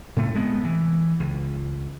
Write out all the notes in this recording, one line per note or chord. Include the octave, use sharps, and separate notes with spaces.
A2 C#3 A3
C3 G#3 A3 B3
E3
C#2